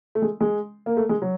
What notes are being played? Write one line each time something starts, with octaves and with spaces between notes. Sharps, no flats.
A3
G#3
G#3
A#3
A3
G#3
F#3